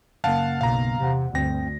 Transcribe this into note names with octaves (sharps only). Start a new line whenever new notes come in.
F#2 C#3 A#3 F5 F#5 A5
B1 F5 A#5
E2 C3 F#5
D2 G2 C4 G5 A#6